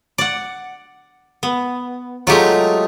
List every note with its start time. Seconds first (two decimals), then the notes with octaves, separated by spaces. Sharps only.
0.18 D5 F#5
1.43 B3
2.27 F#3 G#3 A3 D#4 F4 G4